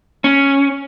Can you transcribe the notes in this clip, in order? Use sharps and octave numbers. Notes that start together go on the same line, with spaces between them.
C#4